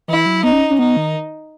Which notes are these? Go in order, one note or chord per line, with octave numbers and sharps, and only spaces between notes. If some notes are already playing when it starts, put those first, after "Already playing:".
E3 E4
F#3
B3 D#4
C#4
C#4
B3 D#4
D#3